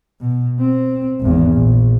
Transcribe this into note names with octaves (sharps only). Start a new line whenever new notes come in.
B2
C4
G#1 E2
A#1